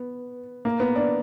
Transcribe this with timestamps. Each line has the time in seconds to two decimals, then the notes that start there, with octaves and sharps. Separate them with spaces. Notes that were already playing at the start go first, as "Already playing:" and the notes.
Already playing: B3
0.65 A#3
0.80 B3
0.96 D4